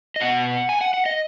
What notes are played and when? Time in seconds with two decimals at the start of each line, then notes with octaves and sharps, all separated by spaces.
0.16 D#5
0.20 B2 B3 F#5
0.69 G#5
0.81 F#5
0.94 F#5
1.06 D#5